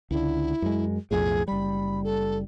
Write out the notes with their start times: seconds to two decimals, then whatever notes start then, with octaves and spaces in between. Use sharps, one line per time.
0.11 C#2 D3 E4
0.62 F#2 G#3
1.11 B1 F2 A2 G#4
1.48 F#1 G3 B5
2.04 A4